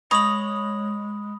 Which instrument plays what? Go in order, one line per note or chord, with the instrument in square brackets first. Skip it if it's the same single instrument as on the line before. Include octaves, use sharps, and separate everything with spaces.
[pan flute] G#3 [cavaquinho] C#5 D#5 [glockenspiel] B5 D#6 F#7